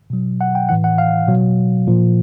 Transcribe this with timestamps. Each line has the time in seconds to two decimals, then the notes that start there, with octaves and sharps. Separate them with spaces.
0.10 B2 F#3
0.41 F#5
0.55 G5
0.69 A2 E3 F#5
0.84 F#5
0.98 F5
1.28 B2 F#3
1.87 A#2 F3